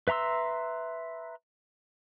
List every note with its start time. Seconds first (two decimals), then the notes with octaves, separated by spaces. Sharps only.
0.08 B4 E5 A#5 C6 E6